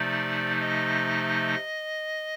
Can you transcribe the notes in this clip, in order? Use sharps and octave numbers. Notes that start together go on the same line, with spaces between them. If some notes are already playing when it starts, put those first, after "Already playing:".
Already playing: C3 F3 A3 D#4 D5
D#5